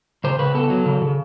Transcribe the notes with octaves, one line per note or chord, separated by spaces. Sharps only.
C#3 C5
C#3 B4
B3 A4
F#3
C#3
C#3